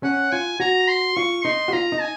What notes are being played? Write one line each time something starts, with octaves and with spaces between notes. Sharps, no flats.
C#4 F#5
F4 G#5
F#4 A#5
C6
F4 C#6
D#4 C6
F#4
F4 A#5
D#4
G#5